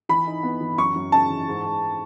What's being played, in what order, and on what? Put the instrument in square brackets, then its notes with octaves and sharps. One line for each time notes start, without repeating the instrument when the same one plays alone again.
[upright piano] E3 [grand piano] B5
[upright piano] D#4
B3
E3
[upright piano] F#2 [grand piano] C#6
[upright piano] F#2
[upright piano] C#3 [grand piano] A5
[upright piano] E3
G#2
G#2